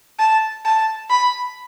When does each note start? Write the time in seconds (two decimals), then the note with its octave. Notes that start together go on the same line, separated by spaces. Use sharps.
0.19 A5
0.65 A5
1.10 B5